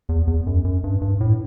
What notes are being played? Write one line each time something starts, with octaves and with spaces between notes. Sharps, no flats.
E2
E2
F#2
F#2
G2
G2
A2